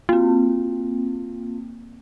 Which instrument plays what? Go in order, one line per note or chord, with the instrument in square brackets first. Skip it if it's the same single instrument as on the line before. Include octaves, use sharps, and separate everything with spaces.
[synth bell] A#3 C4 [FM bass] F4